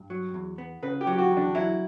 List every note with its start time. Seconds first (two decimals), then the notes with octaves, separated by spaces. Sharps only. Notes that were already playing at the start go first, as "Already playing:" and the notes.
Already playing: G2
0.10 F#3
0.34 E2
0.58 B3
0.83 C#3 B4
1.01 G4
1.07 F#3
1.13 G4
1.18 F#4
1.31 E2
1.37 D4
1.55 F#3 E4